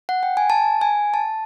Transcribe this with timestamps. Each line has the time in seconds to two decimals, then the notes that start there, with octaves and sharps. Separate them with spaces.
0.09 F#5
0.23 G5
0.37 G#5
0.50 A5
0.81 G#5
1.14 A5